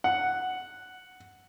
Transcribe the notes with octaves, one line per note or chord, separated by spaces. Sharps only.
F#5